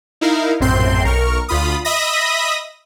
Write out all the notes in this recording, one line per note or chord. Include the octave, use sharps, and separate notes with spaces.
D#4 E4 A#4 F5
A#1 F#2 A2 C4 C6 G6
B1 A#4 C#6 F6
D2 F4 B5 D#6
D#5 E5 B5 D#6 A#6